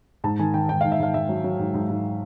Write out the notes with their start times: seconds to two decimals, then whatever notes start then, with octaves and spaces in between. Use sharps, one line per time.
0.24 G#2 A5
0.39 D#3 G#5
0.54 D#3 G5
0.69 G#2 G5
0.81 G#2 F5
0.92 E5
0.99 G#2 F5
1.14 G#2 E5
1.29 F#3
1.44 F#3
1.59 G#2
1.74 G#2
1.90 G#2